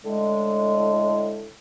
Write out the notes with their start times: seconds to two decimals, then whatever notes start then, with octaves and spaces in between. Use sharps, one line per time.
0.04 A2 D3 G#3